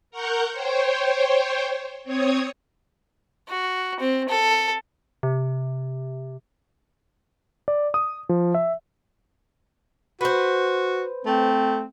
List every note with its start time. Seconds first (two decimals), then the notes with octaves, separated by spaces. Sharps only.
0.11 A#4 F#5 A#5 C#6 G6
0.52 C5 C#5 G5
2.04 C4 C#5 D#6 G#6
3.48 F#4
4.00 C4
4.29 A4
5.23 C3
7.68 D5
7.94 D#6
8.29 F3
8.54 E5
10.21 F#4 B4 C5
11.25 A3 C4